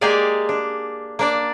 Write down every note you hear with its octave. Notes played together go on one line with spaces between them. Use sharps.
G#3 A#3 G4 G#4 D5 F5
D4
A#3 D4 D5